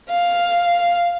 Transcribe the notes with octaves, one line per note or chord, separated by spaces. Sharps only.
F5